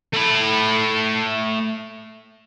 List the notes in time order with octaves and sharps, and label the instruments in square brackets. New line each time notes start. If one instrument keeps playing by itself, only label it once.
[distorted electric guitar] A3 B5